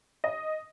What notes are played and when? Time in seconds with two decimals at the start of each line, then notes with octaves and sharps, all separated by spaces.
0.24 D#5